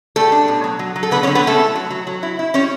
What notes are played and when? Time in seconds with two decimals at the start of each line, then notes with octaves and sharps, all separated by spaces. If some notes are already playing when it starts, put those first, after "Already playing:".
0.16 G3 A3 A4
0.32 D4
0.48 B2
0.64 F#3
0.79 F#3
0.96 F#3
1.03 A4
1.11 D3 B3 B4
1.23 C#4 C#5
1.27 D3
1.35 B3 B4
1.44 A3 C#4 A4
1.59 E4
1.75 F#3
1.90 F#3
2.07 F#3
2.23 E4
2.39 E4
2.54 G3 C#4 C#5